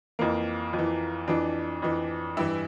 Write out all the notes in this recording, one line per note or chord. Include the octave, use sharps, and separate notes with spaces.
F2 E3 A#3
F2
E3
F2 E3 D4
F2 E3
G2 E3 E4